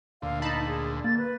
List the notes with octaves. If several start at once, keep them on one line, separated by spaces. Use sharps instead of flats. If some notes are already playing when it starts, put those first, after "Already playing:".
D2 A#2 D3 F5
D#4 A5 B5
G#4
A#3 A6
B4